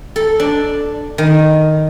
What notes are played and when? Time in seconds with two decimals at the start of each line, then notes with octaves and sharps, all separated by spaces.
0.16 A4
0.40 D4
1.18 D#3